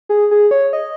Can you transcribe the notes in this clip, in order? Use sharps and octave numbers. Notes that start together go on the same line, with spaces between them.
G#4
G#4
C#5
D#5